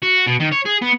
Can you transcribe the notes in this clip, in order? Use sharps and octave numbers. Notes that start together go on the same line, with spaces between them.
F#4
B2
D#3
C#5
G#4
B3